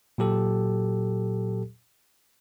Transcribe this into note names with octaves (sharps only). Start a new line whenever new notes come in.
A#2 F#3 G4 A4